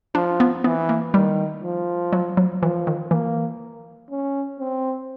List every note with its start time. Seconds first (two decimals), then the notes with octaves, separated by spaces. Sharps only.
0.15 F3 D4
0.40 B3
0.64 E3 B3
0.89 A#3
1.14 D#3 G3
1.63 F3
2.13 F#3
2.37 F#3
2.62 E3 F3
2.87 D#3
3.11 E3 A#3
4.10 C#4
4.59 C4